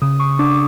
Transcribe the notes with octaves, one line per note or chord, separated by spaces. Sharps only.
C#3 D#6
C#6
D4 D6